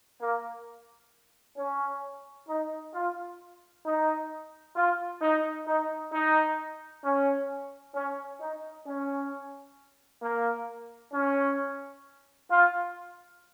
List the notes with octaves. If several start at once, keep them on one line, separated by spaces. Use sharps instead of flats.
A#3
C#4
D#4
F4
D#4
F4
D#4
D#4
D#4
C#4
C#4
D#4
C#4
A#3
C#4
F4